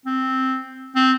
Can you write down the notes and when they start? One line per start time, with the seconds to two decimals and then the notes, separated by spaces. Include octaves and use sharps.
0.06 C4
0.95 C4